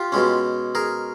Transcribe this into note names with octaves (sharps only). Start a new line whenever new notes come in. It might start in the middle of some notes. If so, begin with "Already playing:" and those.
Already playing: F4 G4
B2 G#3 C#4
G#4 A#4